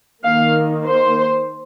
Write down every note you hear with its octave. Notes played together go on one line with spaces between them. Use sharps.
D#3 A#3 F5
C5